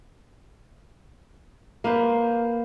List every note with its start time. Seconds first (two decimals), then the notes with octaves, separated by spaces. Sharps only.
1.84 A#3 B4 C5